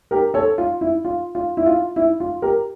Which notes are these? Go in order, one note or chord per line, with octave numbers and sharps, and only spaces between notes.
G4 A#4
A4 C#5
F4
E4
F4
F4
E4
F4
E4
F4
G4 A#4